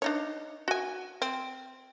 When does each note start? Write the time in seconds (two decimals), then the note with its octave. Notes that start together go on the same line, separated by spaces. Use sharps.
0.02 D4 D#4 C#5
0.68 F#4 G#5
1.22 C4